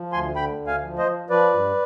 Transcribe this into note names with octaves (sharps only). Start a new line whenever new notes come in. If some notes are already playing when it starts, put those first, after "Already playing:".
Already playing: F3
D2 G#5 C6
D3 G5 B5
D2
F5 G#5
F3
C5 D#5
F3
F3 B4 D5
G2